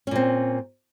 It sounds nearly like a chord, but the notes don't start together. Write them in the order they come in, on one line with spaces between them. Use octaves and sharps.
C#4 A#2 C4